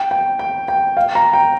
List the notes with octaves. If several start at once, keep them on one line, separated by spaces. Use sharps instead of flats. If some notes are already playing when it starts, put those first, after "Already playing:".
Already playing: G5
G5
G5
G5
F5
A#5
G5